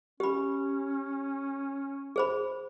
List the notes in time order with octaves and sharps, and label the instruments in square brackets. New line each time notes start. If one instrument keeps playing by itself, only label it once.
[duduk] C#4 [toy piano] G4 B5
[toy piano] G#4 C5 B5